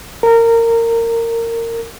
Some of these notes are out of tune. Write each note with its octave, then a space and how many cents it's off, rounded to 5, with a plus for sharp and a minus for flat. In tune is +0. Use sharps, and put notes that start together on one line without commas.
A#4 -20